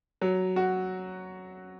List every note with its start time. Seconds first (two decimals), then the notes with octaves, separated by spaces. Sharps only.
0.21 F#3
0.56 F#4